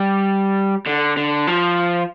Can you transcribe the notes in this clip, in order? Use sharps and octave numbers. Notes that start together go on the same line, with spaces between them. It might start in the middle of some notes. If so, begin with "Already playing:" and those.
Already playing: G3
D3
D3
F3